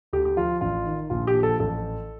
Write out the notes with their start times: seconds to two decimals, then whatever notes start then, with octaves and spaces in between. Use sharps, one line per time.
0.13 D2 G4
0.25 G4
0.37 F3 F4
0.61 A1 F4
0.87 D#3
1.10 A#1 F4
1.27 G4
1.34 F3
1.43 A4
1.59 A1 A4